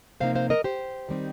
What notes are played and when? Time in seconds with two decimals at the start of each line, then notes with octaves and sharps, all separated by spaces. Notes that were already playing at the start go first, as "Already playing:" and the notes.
0.20 C3 F3 A#3 D#4 C5 F5
0.35 C5 F5
0.50 A#4 D#5
0.64 G4 C5
1.09 D#3 G3 C4 D#4